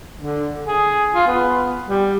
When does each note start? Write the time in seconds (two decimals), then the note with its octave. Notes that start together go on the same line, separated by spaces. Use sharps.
0.17 D3
0.66 G#4
1.14 F4
1.27 B3
1.88 G3